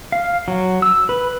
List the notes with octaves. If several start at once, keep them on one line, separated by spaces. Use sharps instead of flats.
F5
F#3
E6
B4